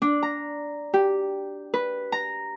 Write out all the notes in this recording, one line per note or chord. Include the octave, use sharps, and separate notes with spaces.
D4
A#5
G4
B4
A#5